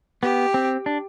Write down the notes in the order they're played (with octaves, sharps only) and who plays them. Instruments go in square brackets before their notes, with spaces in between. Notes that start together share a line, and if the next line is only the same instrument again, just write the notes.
[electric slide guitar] B3 [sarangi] G4
[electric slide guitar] C4
D4